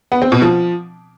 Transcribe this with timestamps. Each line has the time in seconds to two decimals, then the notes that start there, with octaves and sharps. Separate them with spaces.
0.12 B3
0.22 C4
0.32 B2
0.42 F3